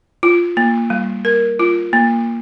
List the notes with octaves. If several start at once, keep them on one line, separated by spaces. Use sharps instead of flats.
F4
A#3
G3
A#4
F4
A#3